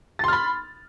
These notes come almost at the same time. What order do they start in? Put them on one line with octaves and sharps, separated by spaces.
A6 C6 F6 B5